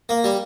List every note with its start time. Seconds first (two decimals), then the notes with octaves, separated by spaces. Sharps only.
0.09 A#3
0.24 G3